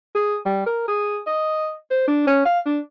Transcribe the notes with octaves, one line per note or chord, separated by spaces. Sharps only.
G#4
G3
A#4
G#4
D#5
C5
D4
C#4
F5
D4